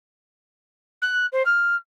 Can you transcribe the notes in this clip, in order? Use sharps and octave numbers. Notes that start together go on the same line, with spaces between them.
F#6
C5
F6